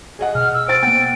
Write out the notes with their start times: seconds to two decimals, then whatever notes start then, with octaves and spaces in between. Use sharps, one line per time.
0.19 G#4 D#5 F#5
0.35 B2 F6
0.54 E6
0.68 C5 G5 A6 D7
0.83 A#3 B3 F#5 G5